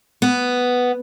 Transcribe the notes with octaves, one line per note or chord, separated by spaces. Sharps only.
B3